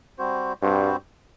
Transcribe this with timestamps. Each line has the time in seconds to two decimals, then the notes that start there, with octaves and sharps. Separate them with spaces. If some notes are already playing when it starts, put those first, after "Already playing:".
0.18 G3 C4 F#4 C5
0.62 G2 G3 C4 F#4 C5